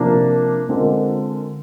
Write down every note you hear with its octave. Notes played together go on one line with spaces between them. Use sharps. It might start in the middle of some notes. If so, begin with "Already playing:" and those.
Already playing: C3 F3 A#3 D4
D3 G#3 C4 F4 A#4